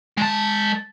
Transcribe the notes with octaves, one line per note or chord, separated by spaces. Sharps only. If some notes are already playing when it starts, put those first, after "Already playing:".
G#3 A5